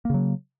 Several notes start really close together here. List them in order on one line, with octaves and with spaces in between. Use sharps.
A#3 C#3 F#3